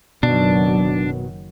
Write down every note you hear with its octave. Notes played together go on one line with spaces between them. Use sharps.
F#1 B2 D#3 F#3 D4